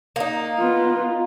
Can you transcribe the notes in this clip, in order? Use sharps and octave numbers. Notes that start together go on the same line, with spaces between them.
A#3 D#4
B3 F4